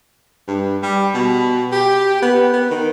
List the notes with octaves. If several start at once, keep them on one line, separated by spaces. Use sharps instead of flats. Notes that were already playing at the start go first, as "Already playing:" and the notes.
G2
G3
B2
G4
B3
B3
D#3